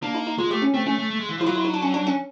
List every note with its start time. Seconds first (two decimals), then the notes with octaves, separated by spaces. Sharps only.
0.02 A#3 D4
0.15 D#4
0.27 D#4
0.38 G#3 F4
0.50 A3 G4
0.62 C#4
0.74 A3 C4
0.86 A3 C#4
0.98 A3
1.10 A3
1.20 G#3
1.29 E3
1.37 F3
1.41 E4
1.46 F#3 F4
1.56 E4
1.65 D#4
1.74 D4
1.82 C#4
1.94 D4
2.07 C#4